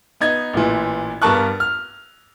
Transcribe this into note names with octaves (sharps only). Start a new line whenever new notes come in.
B3 D#4 G#6
A1 A#2 E3
G2 B3 A#4 A5 C#6 F#6
F6